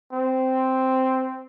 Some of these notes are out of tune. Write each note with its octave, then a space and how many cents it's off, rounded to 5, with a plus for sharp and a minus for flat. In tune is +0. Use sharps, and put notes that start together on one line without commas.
C4 -5